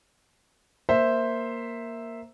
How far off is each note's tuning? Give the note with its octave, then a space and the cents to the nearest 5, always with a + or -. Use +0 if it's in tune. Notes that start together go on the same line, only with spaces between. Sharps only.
A#3 +0 C5 +0 E5 +0